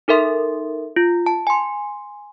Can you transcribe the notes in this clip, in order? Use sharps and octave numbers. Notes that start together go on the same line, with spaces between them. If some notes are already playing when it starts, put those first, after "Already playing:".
D#4 A4 A#4 E5 C6
F4
A5
G#5 C6